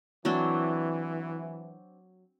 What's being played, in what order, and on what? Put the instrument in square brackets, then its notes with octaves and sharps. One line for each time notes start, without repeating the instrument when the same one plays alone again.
[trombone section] E3 [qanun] F#3 C4 D4